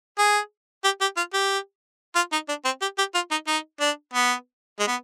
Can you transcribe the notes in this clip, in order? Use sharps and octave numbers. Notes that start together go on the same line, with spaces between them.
G#4
G4
G4
F4
G4
F4
D#4
D4
C4
G4
G4
F4
D#4
D#4
D4
B3
G#3
B3